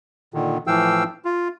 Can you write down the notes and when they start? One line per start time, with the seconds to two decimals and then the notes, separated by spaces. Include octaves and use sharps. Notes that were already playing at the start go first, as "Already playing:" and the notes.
0.34 A#2 D3 D#3
0.67 A2 E3 F3 F5 G5 E6
1.25 F4